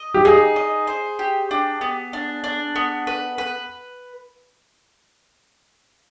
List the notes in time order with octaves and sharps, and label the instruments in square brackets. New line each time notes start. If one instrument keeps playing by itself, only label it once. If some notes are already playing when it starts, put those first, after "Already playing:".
Already playing: [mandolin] D#5
[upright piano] G4
[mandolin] D#4 [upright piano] G#4
[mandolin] D#5
C5
G4
D4
B3
D4
D4
B3
B4
B4